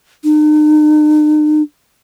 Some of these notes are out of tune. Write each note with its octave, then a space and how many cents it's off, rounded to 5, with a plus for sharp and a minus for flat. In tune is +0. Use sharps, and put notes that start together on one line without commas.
D#4 -45